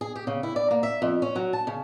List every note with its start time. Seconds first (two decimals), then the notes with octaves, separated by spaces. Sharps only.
0.01 G#4
0.16 G4
0.27 C#3
0.43 E4
0.56 D5
0.71 A#3
0.83 E5
1.02 F2
1.22 C#4
1.36 F#3
1.53 A5
1.67 C#3